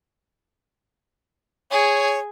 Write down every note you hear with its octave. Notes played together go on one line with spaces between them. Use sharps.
G#4 C#5